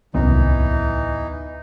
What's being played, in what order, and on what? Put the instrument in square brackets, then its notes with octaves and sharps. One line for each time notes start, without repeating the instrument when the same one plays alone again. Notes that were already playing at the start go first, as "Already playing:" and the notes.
[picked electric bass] D1 B3 [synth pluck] C2 F#2 D#3 [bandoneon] E3 D#4